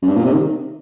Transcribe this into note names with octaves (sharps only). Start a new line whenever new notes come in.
F#2
G2
A#2
C3
D#3